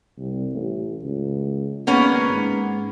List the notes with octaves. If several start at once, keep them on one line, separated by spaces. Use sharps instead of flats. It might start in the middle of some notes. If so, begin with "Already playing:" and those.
C2
A1
C#2
G#1 A#3 B3 C#4
G#2